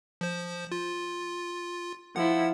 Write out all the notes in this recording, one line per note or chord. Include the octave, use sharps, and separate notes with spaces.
F3 C5
F4
F3 E4 F#5